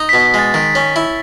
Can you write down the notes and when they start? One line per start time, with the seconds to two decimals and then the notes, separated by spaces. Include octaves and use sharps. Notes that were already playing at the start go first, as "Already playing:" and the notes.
Already playing: D#4
0.09 B2 B6
0.24 B6
0.34 G#3 A6
0.54 D#3
0.75 C#4
0.96 E4